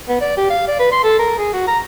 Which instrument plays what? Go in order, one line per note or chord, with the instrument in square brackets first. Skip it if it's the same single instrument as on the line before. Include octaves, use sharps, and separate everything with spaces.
[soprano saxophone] B3
D5
G4
F5
D5
B4
C6
A4
A#4
G#4
F#4
A#5